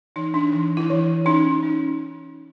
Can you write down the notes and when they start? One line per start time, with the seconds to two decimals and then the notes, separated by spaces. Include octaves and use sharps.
0.16 E3 D#4
0.34 D4
0.53 E3
0.77 E4
0.90 E3
1.26 C#4 D#4
1.63 C#4